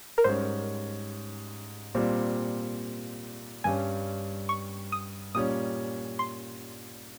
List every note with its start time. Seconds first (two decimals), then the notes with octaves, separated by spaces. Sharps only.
0.18 A#4
0.24 G#2 G3 C#4 C5
1.95 A#2 G3 C4
3.64 G2 G3 C#4 G#5
4.49 C#6
4.92 D#6
5.35 A#2 G3 C#4 D#6
6.19 C6